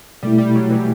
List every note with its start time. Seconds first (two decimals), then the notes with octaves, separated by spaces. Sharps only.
0.23 B2 G3 A3 E4
0.38 G3
0.55 F#3
0.71 E3